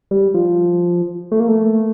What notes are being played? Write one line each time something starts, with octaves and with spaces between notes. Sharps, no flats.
G3
F3
A3
A#3
A3